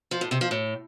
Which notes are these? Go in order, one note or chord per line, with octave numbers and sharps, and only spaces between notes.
F3
A2
C3
F3
A2